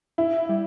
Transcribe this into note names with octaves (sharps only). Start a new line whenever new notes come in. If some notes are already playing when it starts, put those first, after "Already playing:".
E4
G3